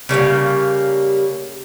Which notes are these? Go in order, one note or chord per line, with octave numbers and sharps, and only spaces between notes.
C#3 G3 A3 A#3